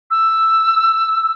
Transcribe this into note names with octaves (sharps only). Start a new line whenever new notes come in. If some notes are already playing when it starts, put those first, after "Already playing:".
E6